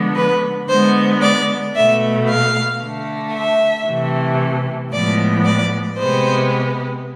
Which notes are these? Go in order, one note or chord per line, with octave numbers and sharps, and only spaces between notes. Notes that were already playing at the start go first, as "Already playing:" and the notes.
Already playing: D3 F3 G#3 B3
B4
D3 G#3 B3 C5
D5
B2 A3 E5
F5
D3 A3
E5
C3 E3 A3
A2 F3 G#3 B3 D5
D5
C3 G#3 B3 C5